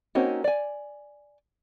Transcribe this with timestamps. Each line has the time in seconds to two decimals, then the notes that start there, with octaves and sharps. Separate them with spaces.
0.15 A#3 C4 C#4 D#4 F#4
0.44 D5 G#5